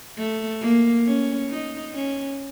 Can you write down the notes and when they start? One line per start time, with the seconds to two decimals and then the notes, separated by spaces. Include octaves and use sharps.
0.17 A3
0.61 A#3
1.05 C#4
1.49 D#4
1.94 C#4